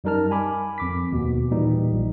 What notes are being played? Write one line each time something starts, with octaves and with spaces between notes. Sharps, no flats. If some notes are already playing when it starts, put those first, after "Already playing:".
F#2 G3 D#4 A#4 A5 F6
G#5 B5 D6
F2 D6 B6
D#2 B2
A#2 E3 G3 D#4
A#1